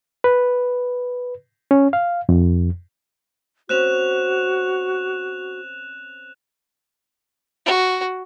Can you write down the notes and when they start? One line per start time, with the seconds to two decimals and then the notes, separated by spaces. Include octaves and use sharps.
0.24 B4
1.71 C#4
1.93 F5
2.29 F2
3.69 C4 C#4 F#4 F#6 E7 F7
7.66 F#4